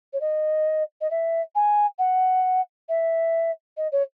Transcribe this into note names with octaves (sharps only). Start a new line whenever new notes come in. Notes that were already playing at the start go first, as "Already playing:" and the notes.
C#5
D#5
D#5
E5
G#5
F#5
E5
D#5
C#5